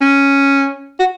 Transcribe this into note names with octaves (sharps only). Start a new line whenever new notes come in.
C#4
F#4